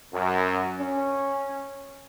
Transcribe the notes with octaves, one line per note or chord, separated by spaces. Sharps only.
F#2
C#4